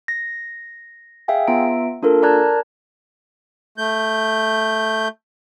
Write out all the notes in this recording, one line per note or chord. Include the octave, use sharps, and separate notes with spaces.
A#6
G#4 E5 F5 G5 G#5
B3 F4 E5 A#5 D7
A#3 D4 F4 A4 A#4
A#4 D5 A5 A#5 F#6 G#6
A3 G6